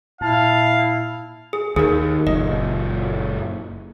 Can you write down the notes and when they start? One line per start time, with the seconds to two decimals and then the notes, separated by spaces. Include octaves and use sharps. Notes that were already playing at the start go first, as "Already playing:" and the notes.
0.21 A#2 E4 F5 A5
1.53 G#4
1.76 D#2 G#4 A#4
2.27 F#1 A#2 D#5